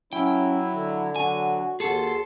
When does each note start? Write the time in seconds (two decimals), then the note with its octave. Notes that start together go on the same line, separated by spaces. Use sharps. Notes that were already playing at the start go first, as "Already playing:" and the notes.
0.13 F#3 C#4 E4 G5
0.74 D3
1.16 F#3 F#4 G#5
1.80 D#2 F#4 G#4 A4 C6